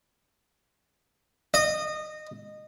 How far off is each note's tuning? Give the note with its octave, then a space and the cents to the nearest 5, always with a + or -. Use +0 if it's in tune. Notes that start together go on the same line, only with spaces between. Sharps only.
D#5 -20